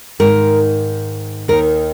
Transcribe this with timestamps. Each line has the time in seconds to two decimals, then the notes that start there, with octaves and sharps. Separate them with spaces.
0.20 G#2 D#3 A#4
1.48 D#2 D#3 A#4